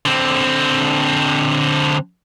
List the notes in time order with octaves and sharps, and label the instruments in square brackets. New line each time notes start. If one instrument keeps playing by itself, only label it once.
[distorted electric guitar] D3 C4